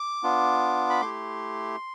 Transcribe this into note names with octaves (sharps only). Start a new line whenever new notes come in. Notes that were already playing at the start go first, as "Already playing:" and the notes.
Already playing: D6
B3 D4 F4
B5
A3 E4 G4 C6